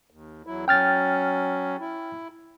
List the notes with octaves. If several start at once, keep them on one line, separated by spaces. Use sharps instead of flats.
D#2
E2 F#3 E4
F#3 C#4 G5 F6 A6
E4